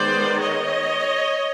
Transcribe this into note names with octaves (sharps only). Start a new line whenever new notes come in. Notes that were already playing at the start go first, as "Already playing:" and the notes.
Already playing: D#3 G#3 B3 C5 D5
C#5 D#5